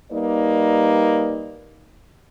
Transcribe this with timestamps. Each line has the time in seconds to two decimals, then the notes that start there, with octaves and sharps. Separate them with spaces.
0.12 G3 A#3 D#4 B4 D5